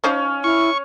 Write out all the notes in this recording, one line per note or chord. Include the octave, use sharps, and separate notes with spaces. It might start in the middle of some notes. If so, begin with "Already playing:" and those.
F3 C#4 D#4 C5
E4 C#6